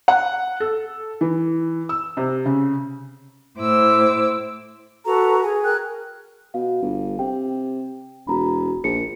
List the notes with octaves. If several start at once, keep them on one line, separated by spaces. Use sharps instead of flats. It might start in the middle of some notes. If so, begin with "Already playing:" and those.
F#5
A4
E3
E6
C3
C#3
A2 E4 C5 D6 E6
F#4 A4 B4 A#5
G#4 G#5
A#4 G5 F#6
B2 F5
G1
C3 G5
E1 F#4 A#5 B5
A#1 F4 A#4 C#7